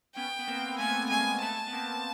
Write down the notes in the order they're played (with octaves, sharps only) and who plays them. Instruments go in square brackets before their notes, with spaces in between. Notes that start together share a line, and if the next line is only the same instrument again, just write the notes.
[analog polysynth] B3 C#4 [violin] G5
[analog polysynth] B3
A#3 C4
A#3
[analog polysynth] A3 B3 [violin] G#5
[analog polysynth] G#3 A#3 [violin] G#5
[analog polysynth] A3 B3 [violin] A5
[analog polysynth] B3
A#3 C4